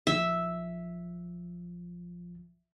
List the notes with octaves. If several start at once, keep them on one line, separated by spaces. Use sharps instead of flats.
A#1 F3 E5